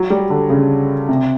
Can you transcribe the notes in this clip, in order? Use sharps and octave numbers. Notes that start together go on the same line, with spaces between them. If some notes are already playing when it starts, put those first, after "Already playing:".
Already playing: F#3
G3
D3
C#3
C3